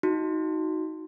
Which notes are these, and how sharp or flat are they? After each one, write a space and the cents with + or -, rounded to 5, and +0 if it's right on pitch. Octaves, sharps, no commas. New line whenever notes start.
D#4 +20 F#4 +0